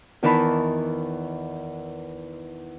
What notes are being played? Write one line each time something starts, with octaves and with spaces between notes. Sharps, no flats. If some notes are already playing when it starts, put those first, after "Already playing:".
E2 D#3 E3 A#4 A5 B5